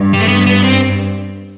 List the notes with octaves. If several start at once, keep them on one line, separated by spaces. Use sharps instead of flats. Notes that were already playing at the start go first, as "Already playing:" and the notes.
Already playing: G2
G3
A3
B3
B3
C4